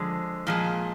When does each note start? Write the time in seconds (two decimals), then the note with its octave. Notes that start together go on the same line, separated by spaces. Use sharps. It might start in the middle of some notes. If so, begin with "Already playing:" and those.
Already playing: D3 F3 G#3
0.47 A#2 F3 G#3